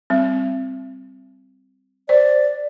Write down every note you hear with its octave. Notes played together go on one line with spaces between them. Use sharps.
G3 C4
C5 D5